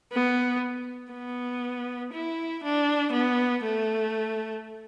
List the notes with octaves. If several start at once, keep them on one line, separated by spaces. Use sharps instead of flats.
B3
B3
E4
D4
B3
A3